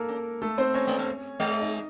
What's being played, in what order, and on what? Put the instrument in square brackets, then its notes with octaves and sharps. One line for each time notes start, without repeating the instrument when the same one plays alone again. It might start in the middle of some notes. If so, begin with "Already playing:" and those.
Already playing: [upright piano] A#3 A4 A#4
[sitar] C#4
[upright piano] A3 A4
C4 C5
[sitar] A#3 [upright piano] C#4 C#5
[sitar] A3
A#3
[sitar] G#3 [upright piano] D#5
[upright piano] E5
D#4 D#5